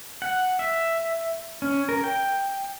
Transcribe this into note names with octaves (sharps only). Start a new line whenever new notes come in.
F#5
E5
C#4
A#4
G5